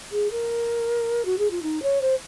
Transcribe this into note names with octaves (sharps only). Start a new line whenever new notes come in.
G#4
A#4
F#4
G#4
F4
D#4
C#5
C5